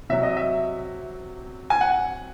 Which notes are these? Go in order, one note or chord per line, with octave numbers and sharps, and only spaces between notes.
C3 F#3 E5
D#5
E5
G#5
F#5